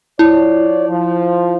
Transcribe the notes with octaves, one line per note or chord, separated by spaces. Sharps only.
F3 E4 C#5 D5
F3